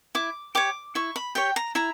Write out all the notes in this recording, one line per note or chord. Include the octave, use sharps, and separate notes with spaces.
E4 D6
G4 C#5 D6
E4 C#6
B5
G4 C#5 G5
A#5
E4 A#5